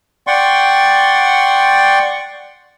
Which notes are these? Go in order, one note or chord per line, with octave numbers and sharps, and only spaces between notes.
D5 F#5 G5 C6 C#6